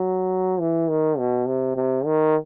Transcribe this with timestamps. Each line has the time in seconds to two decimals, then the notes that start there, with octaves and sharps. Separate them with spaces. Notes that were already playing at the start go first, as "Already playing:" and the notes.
Already playing: F#3
0.60 E3
0.89 D#3
1.18 B2
1.48 C3
1.76 C3
2.05 D#3